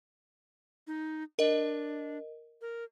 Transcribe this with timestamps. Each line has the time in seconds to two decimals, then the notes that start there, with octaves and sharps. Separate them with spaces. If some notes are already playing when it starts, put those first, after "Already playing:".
0.87 D#4
1.39 D4 A#4 D#5
2.61 A#4